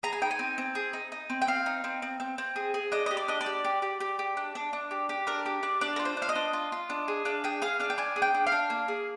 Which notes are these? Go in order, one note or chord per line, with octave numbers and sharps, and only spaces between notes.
G#4 A#5
G#5
D#4 G5
G#5
C4
C4
G#4
D#4
D#4
C4
G5
C4 F5
D#4
C4
C4
C4
C4
G#4
G#4
D4 D#5
G4 D#5
D5
D4 D#5
D5
G4
G4
G4
G4
G4
D4
D4
D4
G4
G4
D4 A#4
G4
D4 D5
D4 D5
A#4
F4
C5
D4
F5
D#5
D4
F4
F4
D4
G#4
D4 F5
G#4 G5
G#4 F5
D4 F5
G5
D4 G#5
G#4
G5
D4
F5
D4
A#3
G#4